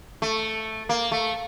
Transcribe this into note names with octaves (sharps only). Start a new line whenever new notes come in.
A3
A#3
A3